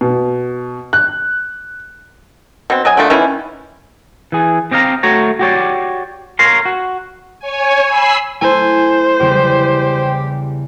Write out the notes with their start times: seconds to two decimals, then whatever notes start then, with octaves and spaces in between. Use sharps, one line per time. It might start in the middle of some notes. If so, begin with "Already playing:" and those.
0.01 B2
0.93 F#6
2.70 B2 C4
2.85 F#3 D#5 G#5
2.97 D3 F3 A3 A#3
3.10 D#3 E3 C#4 E4
4.32 E3 G#4
4.71 C4 G4 D#5 F5 A#5
5.03 A3 F#4 C#5 A#5
5.39 F#4 G4 C#5 D5
6.39 A#4 C#5 F5 A#5 C6
6.65 F#4
7.40 C#5 G#5
7.85 G#5 B5 E6 B6 C7
8.41 A3 E4 A4 C5 G#5
9.20 E2 C#3 G3 G4